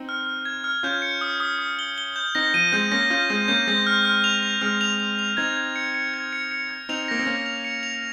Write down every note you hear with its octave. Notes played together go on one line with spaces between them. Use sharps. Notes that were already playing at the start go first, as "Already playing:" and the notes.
Already playing: C4 D#4
F6
F6
G#6
F6
C#4 F4 G6
C#7
D#6
D#6
D#6
G7
G7
G6
C4 D#4 A#6
F3 D#7
G#3 C4 G6
A#3 C#4 A#6
C#4 F4 G6
G#3 C4 G6
A#3 C#4 G6
G#3 C4 A#6
F6
F6
F7
F7
G#3 C4 F6
F7
F7
F7
C4 D#4 G#6
G#6
C#7
C#7
G#6
C#7
C#7
G#6
C4 D#4 F7
A#3 A#6
C4
A#3 C#4 F7
F7
C#7
F7